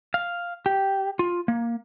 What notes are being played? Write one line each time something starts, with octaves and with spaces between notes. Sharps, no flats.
F5
G4
F4
A#3